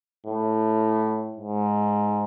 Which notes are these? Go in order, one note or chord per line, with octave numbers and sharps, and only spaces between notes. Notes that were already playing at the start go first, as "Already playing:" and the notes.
A2
G#2